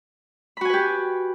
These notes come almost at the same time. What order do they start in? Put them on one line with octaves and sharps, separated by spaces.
B5 F#4 G#5 B4 G4